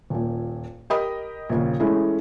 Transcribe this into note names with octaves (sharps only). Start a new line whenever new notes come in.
D#1 A#2
G4 A#4 D#5 B5 D#6
A#1 D#2 C#3
E3 G#3 A3 C#4 E4